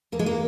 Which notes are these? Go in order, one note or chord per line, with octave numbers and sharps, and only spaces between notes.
E2 A#3
G#3
A#3